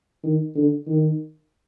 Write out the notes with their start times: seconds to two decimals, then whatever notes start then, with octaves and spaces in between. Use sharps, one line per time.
0.24 D#3
0.55 D3
0.87 D#3